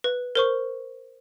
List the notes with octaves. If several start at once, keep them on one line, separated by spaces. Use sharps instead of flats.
B4
A#4 C5 C#6